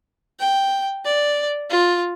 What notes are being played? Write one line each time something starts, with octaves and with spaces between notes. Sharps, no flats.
G5
D5
F4